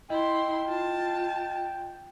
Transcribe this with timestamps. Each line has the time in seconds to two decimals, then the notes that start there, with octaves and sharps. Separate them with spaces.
0.10 E4 D#5 G5 C6
0.66 F4 A5